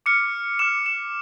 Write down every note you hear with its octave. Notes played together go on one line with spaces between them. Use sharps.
D6 F6 C#7
D6 F6 E7
E7